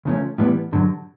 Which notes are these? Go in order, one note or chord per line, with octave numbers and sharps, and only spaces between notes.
C#2 C#3 F3 A3 C#4
A2 E3 G3 B3
G2 D3 F#3